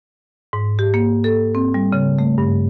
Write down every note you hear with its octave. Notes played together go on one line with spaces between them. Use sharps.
G#2
G4
A#3
A4
C4
G3
C#3
A3
G2